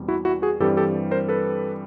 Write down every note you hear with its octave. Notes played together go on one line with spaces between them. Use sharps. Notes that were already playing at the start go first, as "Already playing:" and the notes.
Already playing: E2 B2 G3 C4
E4 F#4
E4 F#4
F#4 G#4
G2 E3 G3 C4 G4 A4
G4 A4
A#4 C5
A4 B4